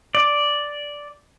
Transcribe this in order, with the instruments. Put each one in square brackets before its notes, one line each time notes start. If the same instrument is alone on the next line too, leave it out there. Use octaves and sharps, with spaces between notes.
[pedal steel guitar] D5